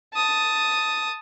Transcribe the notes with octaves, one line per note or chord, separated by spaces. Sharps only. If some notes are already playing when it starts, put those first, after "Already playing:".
A5 D#6